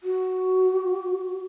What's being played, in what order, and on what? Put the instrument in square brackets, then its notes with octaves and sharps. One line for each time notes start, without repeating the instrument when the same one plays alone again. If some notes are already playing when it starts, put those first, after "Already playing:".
[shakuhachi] F#4